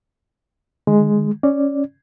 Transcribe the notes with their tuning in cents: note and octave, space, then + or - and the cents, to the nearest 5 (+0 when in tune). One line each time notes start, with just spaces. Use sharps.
D#3 -45 G#3 +0
C#4 +0 D5 +0